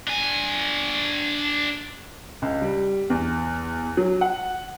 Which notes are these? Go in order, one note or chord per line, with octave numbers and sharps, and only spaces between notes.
D4 G#5
C#2
G3
E2
F#3
F#5